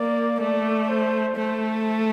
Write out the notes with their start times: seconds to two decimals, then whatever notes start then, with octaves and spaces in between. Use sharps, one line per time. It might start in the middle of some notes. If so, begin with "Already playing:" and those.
Already playing: A#3 D5
0.41 A3 D5
0.89 C5
1.36 A3 C5